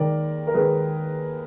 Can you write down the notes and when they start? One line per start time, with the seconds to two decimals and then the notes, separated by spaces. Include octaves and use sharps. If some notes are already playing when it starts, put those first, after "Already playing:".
Already playing: D#2 D#3 G#3 A#4 D5
0.47 A#4
0.54 D#2 D#3 G#3 G#4 B4